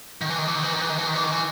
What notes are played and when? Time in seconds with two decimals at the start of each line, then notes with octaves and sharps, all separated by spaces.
0.21 D#3
0.29 E3
0.38 D#3
0.47 E3
0.56 D#3
0.63 E3
0.73 D#3
0.82 E3
0.90 D#3
0.99 E3
1.07 D#3
1.16 E3
1.24 D#3
1.32 E3